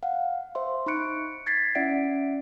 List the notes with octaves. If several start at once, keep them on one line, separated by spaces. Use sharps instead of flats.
F5 F#5
C5 E5 C6
D#4 B5 C#6 F#6 C#7 D7
G#6 A6 B6 C7
C#4 E4 D5 E5 F#5 D7